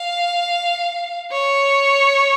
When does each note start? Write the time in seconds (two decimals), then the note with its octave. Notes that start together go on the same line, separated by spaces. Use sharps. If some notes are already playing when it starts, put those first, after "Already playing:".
Already playing: F5
1.31 C#5